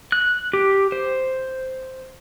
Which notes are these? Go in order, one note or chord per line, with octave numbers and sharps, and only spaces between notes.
F#6
G4
C5